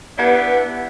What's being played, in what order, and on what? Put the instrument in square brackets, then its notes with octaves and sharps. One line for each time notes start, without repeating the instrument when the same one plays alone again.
[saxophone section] B3 D4 E4 G4 B4